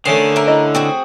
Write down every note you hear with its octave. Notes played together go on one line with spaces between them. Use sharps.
D3 D#3 A3 C#4 C6
A#4 E5
E4 D#5
C4 F#4 G#4